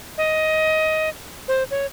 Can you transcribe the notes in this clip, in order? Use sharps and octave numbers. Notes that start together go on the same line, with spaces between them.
D#5
C5
C#5